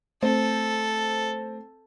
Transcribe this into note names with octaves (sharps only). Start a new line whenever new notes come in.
A3 C4 A4